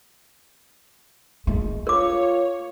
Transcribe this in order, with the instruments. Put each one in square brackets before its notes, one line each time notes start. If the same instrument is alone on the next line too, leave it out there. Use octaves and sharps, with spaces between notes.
[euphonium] G#3 [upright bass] A3
[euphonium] F4 [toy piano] A#4 D6 [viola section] C#5